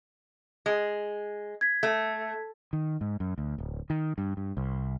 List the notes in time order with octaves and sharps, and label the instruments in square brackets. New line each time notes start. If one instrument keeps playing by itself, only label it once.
[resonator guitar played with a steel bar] G#3
[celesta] G#6 B6
[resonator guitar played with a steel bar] A3
[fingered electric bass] D#3
G#2
F#2
D2
D1
D#3
G2
G2
C2